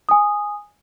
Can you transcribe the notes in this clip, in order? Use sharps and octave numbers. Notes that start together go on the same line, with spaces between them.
G#5 D#6